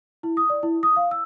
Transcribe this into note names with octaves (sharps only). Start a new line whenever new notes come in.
E4
D#6
D5
E4
D#6
F5
E6